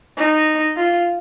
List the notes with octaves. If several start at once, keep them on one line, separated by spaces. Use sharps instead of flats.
D#4
F4